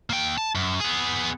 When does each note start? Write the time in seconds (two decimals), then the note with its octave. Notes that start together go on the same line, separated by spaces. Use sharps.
0.10 A#3 G5
0.38 A5
0.55 F#2
0.80 B3 G#4